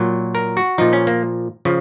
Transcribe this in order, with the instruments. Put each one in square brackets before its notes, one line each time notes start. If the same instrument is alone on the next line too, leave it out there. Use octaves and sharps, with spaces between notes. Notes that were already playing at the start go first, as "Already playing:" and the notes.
Already playing: [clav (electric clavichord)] A#2 F#3
A#4
F#4
A#2 F3 D#4
C#4
A#3
C#3 F3